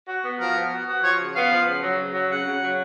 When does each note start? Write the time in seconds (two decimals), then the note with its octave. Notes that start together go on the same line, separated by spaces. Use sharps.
0.08 F#4
0.24 B3
0.40 F3 A#4
0.56 B3
0.71 F#4
0.87 F#4
1.03 F3 C#5
1.19 C#3
1.35 B3 F5
1.51 F3
1.66 C#3
1.83 F#3
1.98 C#3
2.14 F#3
2.30 C#3 F#5
2.46 C#3
2.61 F#3